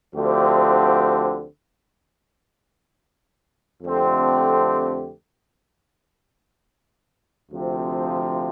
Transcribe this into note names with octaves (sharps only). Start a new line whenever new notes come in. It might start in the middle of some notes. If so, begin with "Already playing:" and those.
D2 D3 F3 C4 G4
F2 D3 A3 C4 G4
D2 C3 F3 C4